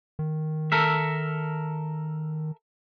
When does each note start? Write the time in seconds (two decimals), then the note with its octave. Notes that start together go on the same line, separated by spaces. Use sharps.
0.19 D#3
0.72 A4 A#4 E5